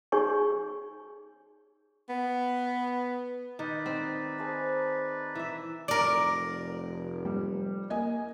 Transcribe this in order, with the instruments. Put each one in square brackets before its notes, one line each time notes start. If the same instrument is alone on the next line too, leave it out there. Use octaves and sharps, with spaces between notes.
[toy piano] D#4 G4 G#4 C#5 G#5 C#6
[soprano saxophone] B3
[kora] D#3 [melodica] D#4 B4 D5
[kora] C4
[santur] G#4 C5 A5
[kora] E3 E5
[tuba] F1 [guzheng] A#4 D5
[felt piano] G3
[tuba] A#3 [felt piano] D#5 G#5